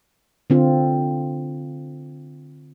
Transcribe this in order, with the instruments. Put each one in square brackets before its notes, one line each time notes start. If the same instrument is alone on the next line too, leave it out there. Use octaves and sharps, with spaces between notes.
[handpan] D3 C4 F4